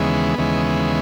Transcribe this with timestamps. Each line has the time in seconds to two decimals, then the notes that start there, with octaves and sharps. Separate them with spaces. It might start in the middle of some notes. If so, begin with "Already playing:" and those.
Already playing: D#2 C#3 E3 G#3 B3
0.38 D#2 C#3 E3 G#3